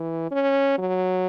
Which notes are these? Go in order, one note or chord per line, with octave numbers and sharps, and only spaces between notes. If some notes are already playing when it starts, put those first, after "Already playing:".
Already playing: E3
C#4
F#3